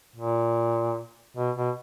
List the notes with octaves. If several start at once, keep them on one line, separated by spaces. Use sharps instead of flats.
A#2
B2
B2